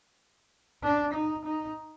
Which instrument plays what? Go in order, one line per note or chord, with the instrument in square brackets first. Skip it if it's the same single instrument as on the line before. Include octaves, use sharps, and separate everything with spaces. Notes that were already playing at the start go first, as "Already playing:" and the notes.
[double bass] D4
D#4
D#4